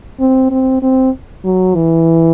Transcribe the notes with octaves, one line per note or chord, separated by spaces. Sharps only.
C4
C4
C4
F#3
E3